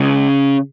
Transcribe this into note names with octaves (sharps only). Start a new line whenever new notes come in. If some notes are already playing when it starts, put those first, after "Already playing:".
Already playing: C#3 G#3